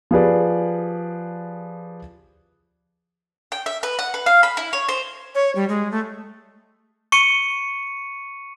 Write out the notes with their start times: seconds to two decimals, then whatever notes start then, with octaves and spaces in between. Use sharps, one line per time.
0.11 F3 G4 G#4 B4 D5
3.52 G5
3.66 E5
3.83 B4
3.99 F#5
4.14 B4
4.26 F5
4.43 B5
4.57 E4
4.73 C#5
4.89 C5
5.35 C#5
5.56 G3
5.69 G#3
5.91 A3
7.12 C#6 C#7 D#7